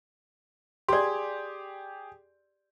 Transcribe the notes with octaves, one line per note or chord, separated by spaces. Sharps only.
G4 G#4 D5 C6